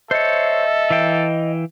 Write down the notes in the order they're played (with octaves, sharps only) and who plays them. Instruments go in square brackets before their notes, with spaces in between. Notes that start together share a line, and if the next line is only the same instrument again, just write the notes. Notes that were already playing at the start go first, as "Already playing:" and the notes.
[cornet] A4 [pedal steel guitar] C5 C#5 [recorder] D#5 [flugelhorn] E5
[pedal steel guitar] E3 F5 G5